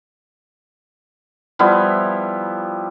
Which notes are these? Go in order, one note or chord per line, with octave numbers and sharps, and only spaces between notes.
F3 G3 B3 E4